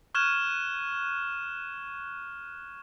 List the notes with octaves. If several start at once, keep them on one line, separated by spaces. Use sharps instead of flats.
C#6 F6 F#6 G#6 E7